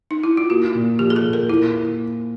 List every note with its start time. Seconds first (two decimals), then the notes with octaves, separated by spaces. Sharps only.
0.11 D#4
0.24 E4
0.37 F4
0.50 A#3 F#4
0.75 A#2
0.99 F3 G4
1.10 G#4
1.16 A4
1.25 A#2
1.33 A#4
1.49 A#3 E4